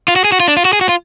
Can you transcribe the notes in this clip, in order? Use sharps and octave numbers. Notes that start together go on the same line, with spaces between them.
F4
F#4
G#4
F#4
F4
D4
F4
F#4
G#4
F#4
F4